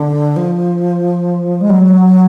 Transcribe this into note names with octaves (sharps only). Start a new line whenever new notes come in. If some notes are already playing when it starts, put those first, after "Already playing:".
Already playing: D3
F3
G#3
F#3